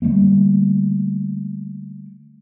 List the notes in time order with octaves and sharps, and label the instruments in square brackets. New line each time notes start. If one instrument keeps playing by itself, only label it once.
[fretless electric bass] D3 G3 A3 A#3